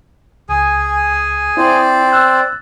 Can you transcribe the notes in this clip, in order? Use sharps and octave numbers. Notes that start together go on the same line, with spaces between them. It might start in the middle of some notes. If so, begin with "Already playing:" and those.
C#2 G#4 G#5
C4 E4 C5 D5
E6 F#6 A6